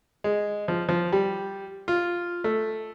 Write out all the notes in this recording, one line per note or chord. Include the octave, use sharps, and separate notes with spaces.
G#3
F3
F3
G3
F4
A3